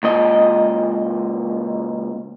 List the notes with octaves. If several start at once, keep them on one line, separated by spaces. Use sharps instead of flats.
C#2 A#2 D#5